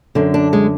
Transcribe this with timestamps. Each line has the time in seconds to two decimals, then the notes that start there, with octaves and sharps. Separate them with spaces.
0.15 F#2 D3
0.34 D4
0.53 G#3